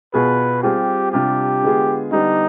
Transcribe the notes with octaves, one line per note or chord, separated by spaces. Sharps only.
B2 B3 F4 G#4 B4
G3 C4 F4 G4 G#4
C3 G3 D4 F4 G4
D3 G#3 B3 F4 G#4
D3 G3 B3 D4 D#4